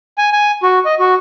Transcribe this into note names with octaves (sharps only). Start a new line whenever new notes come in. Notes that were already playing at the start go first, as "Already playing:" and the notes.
G#5
G#5
F#4
D#5
F#4